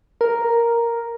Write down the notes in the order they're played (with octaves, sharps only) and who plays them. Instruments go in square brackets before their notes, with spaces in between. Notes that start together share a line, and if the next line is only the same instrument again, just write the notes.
[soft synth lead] A#4